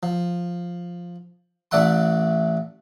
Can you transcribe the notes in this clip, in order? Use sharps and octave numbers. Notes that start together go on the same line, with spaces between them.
F3
A1 A3 D5 E5 F#5 C6